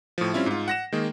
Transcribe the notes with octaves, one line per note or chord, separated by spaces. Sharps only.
A2 F3
G3 C4 C#4 E4 F4
G#2 F4
F#5 A#6 E7
D#3 G#3 A#3